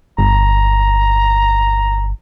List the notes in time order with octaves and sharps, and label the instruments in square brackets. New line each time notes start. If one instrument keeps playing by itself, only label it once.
[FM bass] G1 [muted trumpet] A#5